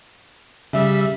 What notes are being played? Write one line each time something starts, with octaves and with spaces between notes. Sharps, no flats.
C#3 G3 E5